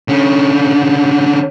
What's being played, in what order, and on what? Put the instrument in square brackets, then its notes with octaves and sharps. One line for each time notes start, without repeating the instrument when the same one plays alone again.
[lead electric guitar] D3 C#4